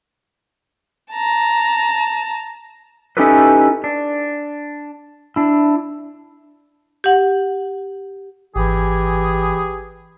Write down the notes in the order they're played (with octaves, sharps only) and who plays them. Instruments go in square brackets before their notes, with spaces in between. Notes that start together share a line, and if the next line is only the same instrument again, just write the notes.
[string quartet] A5 A#5
[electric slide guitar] C#4 D#4 E4 G4 A4 B4
D4
D4 E4
[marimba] G4 F#5
[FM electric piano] G#1 [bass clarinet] E3 [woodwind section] G4 G#4